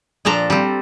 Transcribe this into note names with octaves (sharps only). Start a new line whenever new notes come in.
A#2 F3 D4 A4 A#5
G3 C4